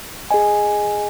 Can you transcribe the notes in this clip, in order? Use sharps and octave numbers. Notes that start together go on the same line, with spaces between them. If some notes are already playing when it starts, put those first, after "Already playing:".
G#4 D#5 G#5